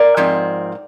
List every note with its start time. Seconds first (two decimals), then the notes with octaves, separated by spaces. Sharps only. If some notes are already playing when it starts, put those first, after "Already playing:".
Already playing: A#4 D5
0.17 G#2 F3 C4